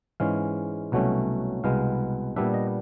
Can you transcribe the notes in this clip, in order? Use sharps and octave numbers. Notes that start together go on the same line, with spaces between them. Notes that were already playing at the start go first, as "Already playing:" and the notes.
G#2 E3 G#3 C#4 F5
C2 B2 F#3 A3 C#4
C2 B2 G#3 B3 F5
A#2 G3 B3 D4 E5
D#5